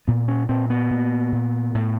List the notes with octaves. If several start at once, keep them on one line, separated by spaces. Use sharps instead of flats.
A#2 B3
C#4
A#2 C4
B3
A#2
A#2
A2